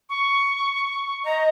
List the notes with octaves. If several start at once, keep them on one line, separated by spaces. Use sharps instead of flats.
C#6
D#5 A#5